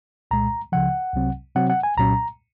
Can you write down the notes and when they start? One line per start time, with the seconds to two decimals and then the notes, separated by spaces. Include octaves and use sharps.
0.31 C2 A#2 G#3 A#5
0.72 C#2 C#3 F3 F#5
1.14 C2 C3 F#3 C4
1.55 C3 F#3 C4 F#5
1.70 F#5
1.83 G#5
1.97 C2 A#2 F#3 C#4 A#5